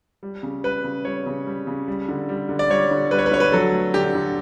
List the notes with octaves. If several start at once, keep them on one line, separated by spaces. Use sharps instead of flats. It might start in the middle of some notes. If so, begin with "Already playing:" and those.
G3
C#3
G3 B4
C#3
G3 C#5
C#3
G3
C#3
G3
D3
G3
D3
D5
G3 C#5
D3
G3 B4
C#5
B4
D3 C#5
B4
F#3 A4
A3
D3 G4
D3